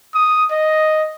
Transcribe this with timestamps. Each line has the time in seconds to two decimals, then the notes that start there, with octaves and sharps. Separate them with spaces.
0.14 D#6
0.50 D#5